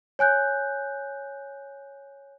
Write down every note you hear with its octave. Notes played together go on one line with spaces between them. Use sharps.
C#5 G#5 F#6 G6